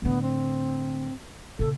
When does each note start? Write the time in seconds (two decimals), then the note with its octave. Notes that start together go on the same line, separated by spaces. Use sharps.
0.02 A2 D3 B3
0.22 C4
1.59 A#2 C#3 A4